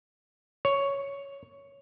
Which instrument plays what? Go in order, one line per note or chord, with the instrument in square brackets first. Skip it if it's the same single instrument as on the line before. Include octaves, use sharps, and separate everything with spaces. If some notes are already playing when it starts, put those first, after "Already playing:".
[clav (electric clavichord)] C#5